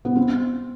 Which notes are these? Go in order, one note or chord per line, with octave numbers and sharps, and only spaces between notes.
B3
C4